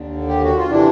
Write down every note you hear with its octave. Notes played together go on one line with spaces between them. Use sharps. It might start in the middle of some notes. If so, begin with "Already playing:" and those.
Already playing: D#2 D3
G4
F#4
F4
C3 E3 D4 E4